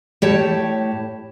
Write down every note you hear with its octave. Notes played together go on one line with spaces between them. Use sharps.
A2 G4 C#5 A5